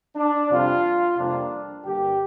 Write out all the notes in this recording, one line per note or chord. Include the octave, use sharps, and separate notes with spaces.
D4
F2 C3 G3 F4
F2 C3 G3 A#3 D4
G2 D3 A#3 G4